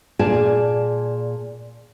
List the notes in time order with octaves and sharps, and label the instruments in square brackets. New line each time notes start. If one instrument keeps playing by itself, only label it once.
[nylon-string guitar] A#2 G#4 D5 G#5 A5